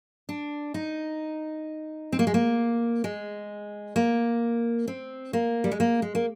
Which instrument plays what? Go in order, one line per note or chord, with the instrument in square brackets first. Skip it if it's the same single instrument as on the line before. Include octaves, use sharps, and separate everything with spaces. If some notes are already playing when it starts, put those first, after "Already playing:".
[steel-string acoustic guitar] D4
D#4
C4
A#3
G#3
A#3
G#3
A#3
C4
A#3
G3
G#3
A#3
G#3
A#3